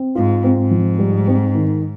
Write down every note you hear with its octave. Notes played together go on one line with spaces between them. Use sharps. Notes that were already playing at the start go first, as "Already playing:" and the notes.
Already playing: C4
G#2 F4
C4
G#2
F3
G3
C4
D#3